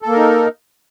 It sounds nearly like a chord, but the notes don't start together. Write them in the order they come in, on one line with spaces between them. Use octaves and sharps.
A4 A#3 A#4 D#4